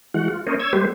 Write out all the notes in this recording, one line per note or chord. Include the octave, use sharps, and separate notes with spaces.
E3 G#3 F#4 F#5
F4
A#3 C#4 A#4 C5 C#5 D#5
C#5 E6 G#6
G3 G#3 A#3 G4 B4 C5